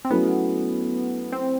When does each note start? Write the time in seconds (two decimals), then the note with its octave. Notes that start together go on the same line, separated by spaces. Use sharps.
0.05 C4
0.11 F#3 A3 B3 C#4 E4
1.32 C4